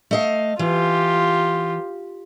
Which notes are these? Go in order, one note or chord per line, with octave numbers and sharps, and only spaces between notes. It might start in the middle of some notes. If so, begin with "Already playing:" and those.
A3 D#5 F5
E3 F4 G4